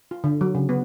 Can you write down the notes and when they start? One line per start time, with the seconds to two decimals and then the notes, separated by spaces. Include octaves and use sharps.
0.11 F4
0.24 D3
0.41 F#3
0.55 C#3
0.69 B3